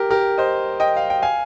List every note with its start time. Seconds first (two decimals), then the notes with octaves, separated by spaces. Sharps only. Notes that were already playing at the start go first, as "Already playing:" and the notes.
Already playing: G4 A#4
0.10 G4 A#4
0.38 C5 D#5
0.80 D#5 G5
0.97 F5
1.10 G5
1.22 F5 G#5